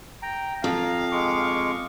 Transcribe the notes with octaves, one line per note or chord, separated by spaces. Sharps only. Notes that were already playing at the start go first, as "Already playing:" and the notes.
G5 A#5
F2 F5 A#5
G#3 C#6 D6